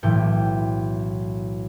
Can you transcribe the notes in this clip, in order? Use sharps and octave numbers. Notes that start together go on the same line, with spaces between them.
B1 A2 E3 G5